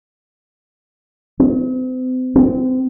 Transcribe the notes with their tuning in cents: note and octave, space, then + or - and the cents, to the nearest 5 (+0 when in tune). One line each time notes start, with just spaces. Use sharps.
C4 -40
C4 -30